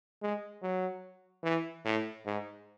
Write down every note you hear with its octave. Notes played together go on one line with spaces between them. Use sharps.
G#3
F#3
E3
A2
G#2